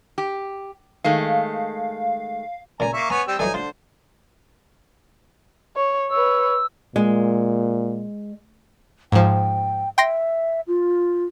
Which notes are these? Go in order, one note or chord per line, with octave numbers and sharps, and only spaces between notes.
G4
D#3 G#3 A3 F5
C#2 A#2 G#5 A#5
A#3 E5 C#6
B3 C#5 G#5 A#5
G3 C4 E6
D3 E3 F#3 D#4 G#5
D3 F4 C5
C#5
B4 C#5 E6
A#2 G#3
G#2 F3 G5
E5 G5 C6 A#6
F4